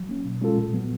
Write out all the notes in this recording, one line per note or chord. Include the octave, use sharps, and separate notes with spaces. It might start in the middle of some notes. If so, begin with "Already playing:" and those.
Already playing: F#3
A#3 C#4
B2
G#3 C#4 F4 A4
A#2
F#3 B3